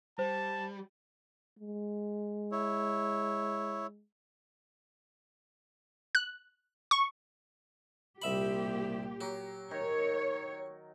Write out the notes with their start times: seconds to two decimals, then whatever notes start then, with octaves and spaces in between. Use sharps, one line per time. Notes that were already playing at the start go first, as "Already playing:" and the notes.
0.19 G3 C5 A5
1.60 G#3
2.52 E4 C#5
6.15 F#6
6.91 C#6
8.22 C2 A#2 G4 E5 B5
9.21 F#3 G4
9.71 D#3 C#5